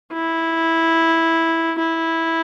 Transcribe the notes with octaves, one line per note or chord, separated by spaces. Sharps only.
E4
E4